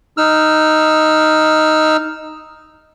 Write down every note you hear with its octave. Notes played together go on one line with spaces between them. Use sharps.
D#4 E6 F6